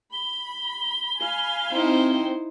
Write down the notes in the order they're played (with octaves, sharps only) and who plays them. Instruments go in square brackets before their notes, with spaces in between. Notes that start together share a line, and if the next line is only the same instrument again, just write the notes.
[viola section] B5 [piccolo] G7
[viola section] F5 G#5 B5
[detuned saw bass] C4 [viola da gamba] D#4 E4 C5